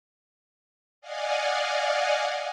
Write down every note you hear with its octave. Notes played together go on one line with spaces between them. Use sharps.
D5 D#5 F5 F#5 G#5